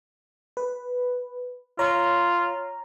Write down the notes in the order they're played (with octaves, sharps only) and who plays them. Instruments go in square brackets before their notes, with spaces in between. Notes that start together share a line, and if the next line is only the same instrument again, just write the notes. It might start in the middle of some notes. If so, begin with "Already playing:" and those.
[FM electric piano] B4
[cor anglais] F4 [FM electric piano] C#5 A#5